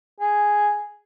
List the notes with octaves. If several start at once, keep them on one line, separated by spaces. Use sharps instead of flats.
G#4